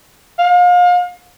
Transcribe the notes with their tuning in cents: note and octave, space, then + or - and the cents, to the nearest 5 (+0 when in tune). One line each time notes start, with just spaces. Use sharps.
F5 +35